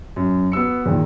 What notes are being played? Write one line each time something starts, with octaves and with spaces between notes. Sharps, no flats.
F#2
B3 F#4 E6 C#7
E2 A#2 D#3